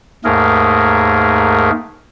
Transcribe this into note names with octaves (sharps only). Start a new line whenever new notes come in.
D#2 G#2 A3 G#4 A#4